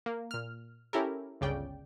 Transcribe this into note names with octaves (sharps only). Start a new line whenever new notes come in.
A#3
A#2 F6
C#4 E4 G4 A4 A#4
G1 C#2 C#3 D5 G5